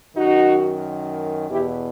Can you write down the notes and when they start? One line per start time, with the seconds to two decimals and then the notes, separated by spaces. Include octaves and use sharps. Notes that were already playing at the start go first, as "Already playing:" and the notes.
0.16 F#2 D#3 D#4 F#4
1.49 E2 B2 E4 G4